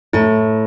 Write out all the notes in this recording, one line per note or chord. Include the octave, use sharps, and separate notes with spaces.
A2 E4